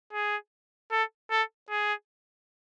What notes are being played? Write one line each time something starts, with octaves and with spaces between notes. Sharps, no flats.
G#4
A4
A4
G#4